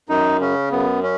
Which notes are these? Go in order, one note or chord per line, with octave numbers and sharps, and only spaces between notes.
F#2 D#4
C#3 C#4
F#2 B3
C#4